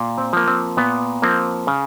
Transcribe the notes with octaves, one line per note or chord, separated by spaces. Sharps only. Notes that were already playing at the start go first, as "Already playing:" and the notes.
Already playing: A#2
C4
F3 A#3
C4
A#2 B3
F3 A#3 C4
C#3